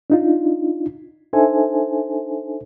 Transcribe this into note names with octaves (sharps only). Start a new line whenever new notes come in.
D4 D#4 F4
D4 D#4 A4 C5 E5 G#5